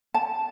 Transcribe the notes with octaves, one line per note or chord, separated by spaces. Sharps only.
A5